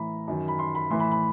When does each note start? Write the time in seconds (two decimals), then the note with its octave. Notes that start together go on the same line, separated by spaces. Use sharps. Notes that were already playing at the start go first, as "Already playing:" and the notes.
Already playing: A2 E3 A#5 B5
0.28 F#2 D#3
0.48 B5
0.59 C6
0.75 B5
0.90 A2 E3 C6
1.00 B5
1.11 B5